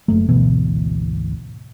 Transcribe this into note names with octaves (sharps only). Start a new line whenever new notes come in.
F#1 F#3 A3
G#1 D2 B2 E3